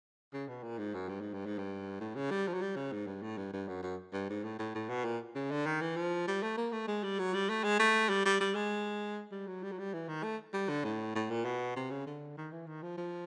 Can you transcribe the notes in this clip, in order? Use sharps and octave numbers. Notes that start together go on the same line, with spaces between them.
C#3
B2
A#2
G#2
F#2
G2
G#2
G2
G#2
G2
A2
C#3
G3
F3
F#3
G3
C#3
G#2
G2
A2
G2
G2
F#2
F#2
G2
G#2
A2
A2
A2
B2
A#2
C#3
D3
D#3
E3
F3
G3
A3
A#3
A3
G#3
G3
F#3
G3
A3
G#3
A3
G3
G3
G3
G#3
G3
F#3
G3
F#3
G3
E3
D#3
A3
G3
D3
A2
A2
A#2
B2
C3
C#3
D3
D#3
E3
D#3
F3
F3